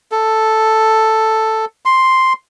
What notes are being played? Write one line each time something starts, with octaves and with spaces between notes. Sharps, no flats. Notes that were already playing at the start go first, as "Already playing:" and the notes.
A4
C6